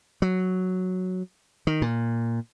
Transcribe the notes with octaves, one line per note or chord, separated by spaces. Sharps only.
F#3
D#3
A#2